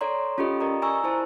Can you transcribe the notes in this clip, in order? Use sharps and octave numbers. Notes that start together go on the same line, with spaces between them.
A4 C#5 D5 A#5 C6
C#4 F4 G4 A4 D#5
G4 A#4 D5 D#5 A#5
D5 G#5 A#5 C#6 E6
E4 C5 A5